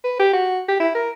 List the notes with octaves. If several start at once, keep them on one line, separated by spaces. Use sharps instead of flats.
B4
G4
F#4
G4
E4
A#4